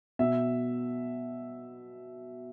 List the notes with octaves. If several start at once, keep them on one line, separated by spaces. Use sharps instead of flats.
B2 E5